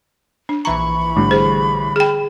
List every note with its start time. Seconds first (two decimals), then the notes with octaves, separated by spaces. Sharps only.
0.49 D4
0.65 A#1 E3 A#5 B5 C#6
1.16 A2 D3 G3
1.31 G#4 C5
1.96 G#4 G5